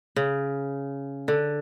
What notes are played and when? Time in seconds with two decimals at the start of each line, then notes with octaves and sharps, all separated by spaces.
0.16 C#3
1.28 D3